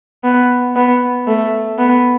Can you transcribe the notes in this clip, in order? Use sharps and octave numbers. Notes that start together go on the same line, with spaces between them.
B3
B3
A3
B3